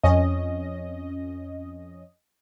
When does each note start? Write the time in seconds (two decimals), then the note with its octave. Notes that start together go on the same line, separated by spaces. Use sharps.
0.03 F2 C#4 D#5